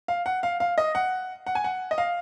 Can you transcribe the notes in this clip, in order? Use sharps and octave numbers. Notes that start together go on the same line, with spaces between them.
F5
F#5
F5
F5
D#5
F#5
F#5
G#5
F#5
D#5
F5